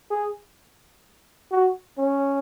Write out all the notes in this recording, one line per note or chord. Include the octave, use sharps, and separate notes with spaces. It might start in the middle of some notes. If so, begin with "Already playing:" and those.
G#4
F#4
C#4